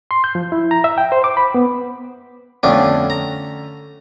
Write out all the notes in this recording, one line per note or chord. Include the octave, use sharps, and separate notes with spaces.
C6
G6
F3
E4
A#5
E5
G5
C5
D6
B5
B3
F2 D3 A3 B3 C#4 D4
A#5